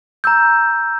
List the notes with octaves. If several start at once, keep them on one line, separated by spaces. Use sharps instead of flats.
A#5 E6 G6